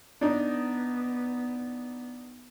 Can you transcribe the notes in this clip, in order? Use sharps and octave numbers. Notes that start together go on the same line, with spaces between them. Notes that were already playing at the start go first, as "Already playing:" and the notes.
B3 D4 D#4